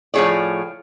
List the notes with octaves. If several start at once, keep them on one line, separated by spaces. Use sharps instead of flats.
A2 F3 D#4 G#4 C#5 D5